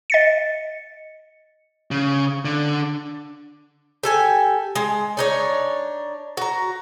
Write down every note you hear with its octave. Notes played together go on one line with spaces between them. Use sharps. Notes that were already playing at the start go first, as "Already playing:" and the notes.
D#5 A6 C#7
C#3
D3
G4 A4 G#5
G#3
D4 D#4 C#5
F#4 A#5